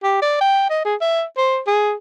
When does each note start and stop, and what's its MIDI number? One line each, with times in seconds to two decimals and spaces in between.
0.03 0.19 67
0.22 0.38 74
0.41 0.67 79
0.70 0.81 75
0.85 0.95 68
1.01 1.24 76
1.37 1.59 72
1.67 1.93 68